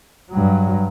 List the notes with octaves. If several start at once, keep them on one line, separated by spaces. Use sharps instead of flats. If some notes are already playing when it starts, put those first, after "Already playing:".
G2 F#3